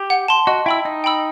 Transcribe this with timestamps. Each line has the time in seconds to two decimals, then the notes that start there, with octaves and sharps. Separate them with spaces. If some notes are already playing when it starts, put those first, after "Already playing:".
Already playing: G4
0.10 F#5
0.28 A5 C6
0.47 F#4 D#5
0.66 E4 G5 B5 E6
0.85 D#4 D#5
1.04 G5 B5 E6